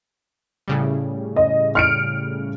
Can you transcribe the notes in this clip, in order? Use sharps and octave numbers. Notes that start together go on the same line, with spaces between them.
A2 C#3 G3
D#5
F6 C#7 D7